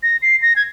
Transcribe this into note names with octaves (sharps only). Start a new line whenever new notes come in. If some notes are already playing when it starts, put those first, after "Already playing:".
A#6
C7
A#6
G#6